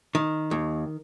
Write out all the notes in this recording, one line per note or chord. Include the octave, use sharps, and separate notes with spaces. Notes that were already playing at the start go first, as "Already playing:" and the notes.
D#3
D#2